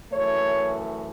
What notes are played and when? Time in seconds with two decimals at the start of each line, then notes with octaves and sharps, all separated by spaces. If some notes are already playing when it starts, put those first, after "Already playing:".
0.12 F#2 E3 A3 C#5